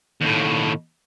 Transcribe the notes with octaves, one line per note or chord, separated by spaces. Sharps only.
D#2 A2